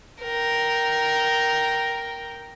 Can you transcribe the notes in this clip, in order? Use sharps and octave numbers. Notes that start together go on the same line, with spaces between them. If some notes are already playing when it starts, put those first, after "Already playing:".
A#4 G5